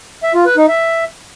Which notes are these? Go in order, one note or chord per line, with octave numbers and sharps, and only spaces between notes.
E5
F4
B4
D#4
E5